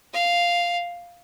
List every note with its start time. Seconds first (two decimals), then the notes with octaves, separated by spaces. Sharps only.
0.13 F5